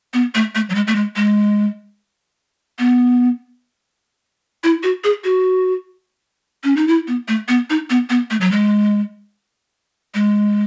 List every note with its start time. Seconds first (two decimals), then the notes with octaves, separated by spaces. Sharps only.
0.14 B3
0.35 A3
0.55 A3
0.70 F#3
0.75 G#3
0.87 A3
0.96 G#3
1.16 G#3
2.79 B3
4.64 E4
4.83 F#4
5.04 G#4
5.24 F#4
6.64 C#4
6.77 D#4
6.88 E4
7.08 B3
7.28 A3
7.48 B3
7.70 D#4
7.90 B3
8.10 B3
8.31 A3
8.41 F#3
8.52 G#3
10.15 G#3